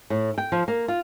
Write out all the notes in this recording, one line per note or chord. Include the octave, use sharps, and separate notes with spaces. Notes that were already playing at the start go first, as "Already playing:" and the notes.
A2
G5
F3
A#3
F4